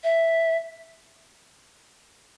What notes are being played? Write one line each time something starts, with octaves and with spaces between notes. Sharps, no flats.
E5